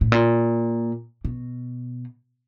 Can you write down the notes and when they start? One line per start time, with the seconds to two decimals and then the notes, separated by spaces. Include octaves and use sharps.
0.01 A2
0.12 A#2
1.25 B2